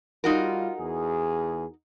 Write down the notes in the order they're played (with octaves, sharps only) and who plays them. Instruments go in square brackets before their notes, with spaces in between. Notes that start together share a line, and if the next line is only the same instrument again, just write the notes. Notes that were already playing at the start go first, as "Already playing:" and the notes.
[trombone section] G3 F4 [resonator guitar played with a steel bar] D#4 F#4 A#4
[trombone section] E2 G#4